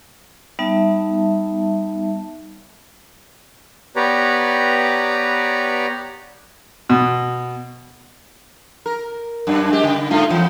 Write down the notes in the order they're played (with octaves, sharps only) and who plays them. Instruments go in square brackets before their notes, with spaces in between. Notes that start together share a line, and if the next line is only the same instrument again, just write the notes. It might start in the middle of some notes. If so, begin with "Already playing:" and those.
[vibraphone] G3 B3 D#4 E5 A5
[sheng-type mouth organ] B3 G4 B4 C#5 D5 A#5
[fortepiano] B2
[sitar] A#4
F#2 D4
G#3 G4
C#3
G2 A3 F4
F2 E3